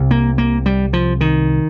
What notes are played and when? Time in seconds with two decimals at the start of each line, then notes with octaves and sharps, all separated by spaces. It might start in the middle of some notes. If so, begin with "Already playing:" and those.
Already playing: C2 C3
0.11 A#3
0.38 A#3
0.66 G3
0.93 F3
1.21 D#3